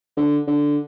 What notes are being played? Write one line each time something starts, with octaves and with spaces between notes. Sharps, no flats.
D3
D3